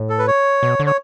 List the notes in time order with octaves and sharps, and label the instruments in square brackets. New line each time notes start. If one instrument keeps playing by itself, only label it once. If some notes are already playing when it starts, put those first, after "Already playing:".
Already playing: [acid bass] A2
[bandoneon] A4
B4
C#5
[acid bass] B2
D3
[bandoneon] C#5